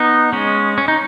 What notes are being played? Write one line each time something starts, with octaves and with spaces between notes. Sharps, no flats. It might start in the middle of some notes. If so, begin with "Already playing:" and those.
Already playing: B3 D#4
G#3 C#4
C#4
D#4